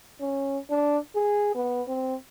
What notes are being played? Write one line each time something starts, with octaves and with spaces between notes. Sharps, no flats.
C#4
D4
G#4
B3
C4